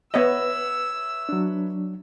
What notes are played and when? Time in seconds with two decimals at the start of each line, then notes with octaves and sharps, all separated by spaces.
0.14 B3 B4 C#5 D#5 E5 E6
1.29 F#3 D4